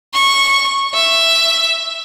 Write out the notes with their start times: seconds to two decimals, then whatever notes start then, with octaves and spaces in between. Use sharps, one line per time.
0.14 C#6
0.94 E5